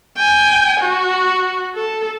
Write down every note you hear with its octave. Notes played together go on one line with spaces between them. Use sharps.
G5 G#5
F#4
A4